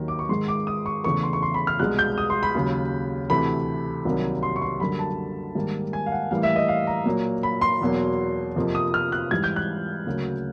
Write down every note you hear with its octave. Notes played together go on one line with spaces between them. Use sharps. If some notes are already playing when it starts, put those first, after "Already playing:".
Already playing: D#2 D#3 F#3
D6
C#6
G#2 D#3 G#3 C6
D6
D#6
C#6
E2 C#3 E3 A3 C#6
C6
C#6
C6
B5
F6
C2 B2 G#3 F#6
G6
D#6
C6
B5
D#2 C#3 F#3
D2 C3 E3 A3 B5
C2 C3 D#3 F#3 A#3
C6
C#6
C6
F#2 D3 G3 A#3 B5
A5
G#2 D#3 G3 A#3
G#5
F5
F#5
A2 E3 G3 A#3 F5
E5
D#5
F5
A#5
A#2 F#3 A#3
B5
C6
E2 B2 F#3 A#3
F2 C3 F3 A#3
D#6
F6
F#6
G#2 E3 G3 G#6
G6
F#6
D2 C#3 F#3 A#3